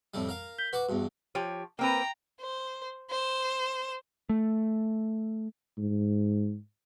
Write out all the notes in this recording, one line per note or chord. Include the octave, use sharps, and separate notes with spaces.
F2 A2 G3
A#4 F5
G6 B6 G7
F#4 B4 C#6 D6
E2 G2 F#4
F3 G4 C#5
A#3 C4 B4 G5 A#5
C5
C5 E7
A3
G#2